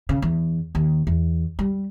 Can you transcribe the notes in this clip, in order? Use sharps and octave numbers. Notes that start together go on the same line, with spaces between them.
C#3
E2
D#2
E2
G3